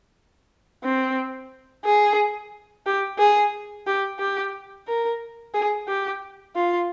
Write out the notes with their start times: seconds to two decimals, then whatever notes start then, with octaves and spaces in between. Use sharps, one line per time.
0.84 C4
1.85 G#4
2.86 G4
3.19 G#4
3.87 G4
4.20 G4
4.88 A#4
5.54 G#4
5.88 G4
6.56 F4